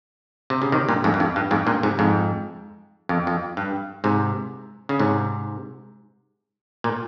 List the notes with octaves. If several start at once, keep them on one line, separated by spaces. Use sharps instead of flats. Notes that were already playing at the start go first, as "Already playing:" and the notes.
C3
C#3
C3 D#3
G2 A#2
F2 G#2
G2
F2
G2
F2 G#2
G2 A#2
G#2 C3
F2 G#2
F2
F2
G2
G#2 C3
C#3
G#2 C3
A#2